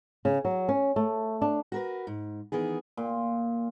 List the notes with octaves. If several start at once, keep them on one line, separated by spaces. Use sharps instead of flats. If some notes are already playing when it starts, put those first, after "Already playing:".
C#3
F#3
C#4
A3
D4
F#4 A#4 B4
G#2
D#3 E3 B3 G#4
A#2